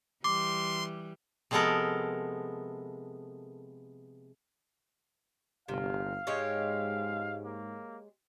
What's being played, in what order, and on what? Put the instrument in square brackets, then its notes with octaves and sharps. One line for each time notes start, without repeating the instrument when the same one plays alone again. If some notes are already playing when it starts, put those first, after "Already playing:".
[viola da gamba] E3 G3 [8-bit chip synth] C6 [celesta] D6
[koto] C3 F3 G#3 B3 A4 A#4
[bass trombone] G1 [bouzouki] C3 [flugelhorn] F5
[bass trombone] G#2 [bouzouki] G#3 G4 C#5
[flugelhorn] A#3